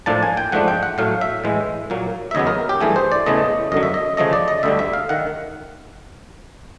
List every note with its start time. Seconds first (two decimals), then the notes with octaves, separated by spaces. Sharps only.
0.06 A2 F3 A#3 D4 A5
0.23 G#5
0.37 G5
0.52 G#2 F3 A3 D4 F#5
0.68 G5
0.83 F#5
0.98 A2 F#3 A3 F5
1.21 E5
1.44 A2 E3 G#3
1.90 A#2 F#3 A#3
2.31 E5
2.35 D#2 C#3 F#3 B3 D#5
2.47 A#4
2.69 G4
2.81 G2 E3 A3 G#4
2.96 C5
3.12 D5
3.26 E2 C#3 E3 A3 D#5
3.72 F#2 D3 F#3 D#5
3.83 E5
3.94 D#5
4.17 D2 C#3 F3 A3 D#5
4.33 D5
4.48 D#5
4.63 D2 D3 G3 E5
4.79 E5
4.93 F5
5.09 D#3 F#5